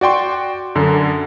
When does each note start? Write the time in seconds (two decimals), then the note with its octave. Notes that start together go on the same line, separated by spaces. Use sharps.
0.01 F#4 D5 G5 C6 C#6
0.75 F#2 D3